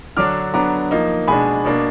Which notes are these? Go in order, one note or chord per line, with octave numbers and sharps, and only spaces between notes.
D3 F#3 D4 D6 F6
D3 F#3 B3 D4 A#5 D6
F3 A#3 D#4
B2 G#3 D4 G#5 B5
B2 A#3 D4